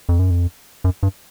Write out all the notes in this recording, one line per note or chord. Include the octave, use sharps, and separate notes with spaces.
F2
F#2
F2
F#2
G2